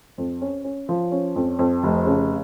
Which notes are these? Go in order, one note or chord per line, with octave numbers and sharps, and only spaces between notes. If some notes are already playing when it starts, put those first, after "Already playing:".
F2
C#4
C#4
F3
C#4
F2
F2
F1
C#3